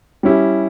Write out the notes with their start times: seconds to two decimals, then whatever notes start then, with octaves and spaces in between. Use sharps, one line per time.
0.23 G3 C#4 E4 G4